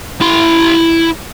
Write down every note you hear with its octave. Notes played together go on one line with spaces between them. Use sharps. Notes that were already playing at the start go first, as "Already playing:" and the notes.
E4 C6